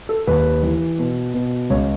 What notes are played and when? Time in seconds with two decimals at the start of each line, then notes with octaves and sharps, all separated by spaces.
0.09 A4
0.27 D#2 B4
0.63 E3
0.99 B2
1.34 B2
1.70 C#2 C#5